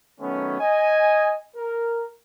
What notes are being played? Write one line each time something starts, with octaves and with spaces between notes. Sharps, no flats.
D#3 F#3 A3 B3 C#4
D#5 G#5
A#4